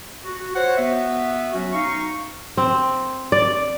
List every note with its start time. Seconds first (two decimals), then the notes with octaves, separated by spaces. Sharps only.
0.24 F#4
0.55 C5 C#5 F#5
0.77 B3 F#4 E5
1.53 F#3 C#4 F#4
1.72 D#4 F5 C#6
2.57 C4
3.32 D5